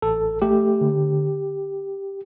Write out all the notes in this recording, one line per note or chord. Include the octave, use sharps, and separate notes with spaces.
A1 A4
A3 G4
D3